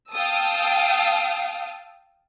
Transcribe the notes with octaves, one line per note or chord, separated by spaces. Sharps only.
F5 G5 A5 D#6 E6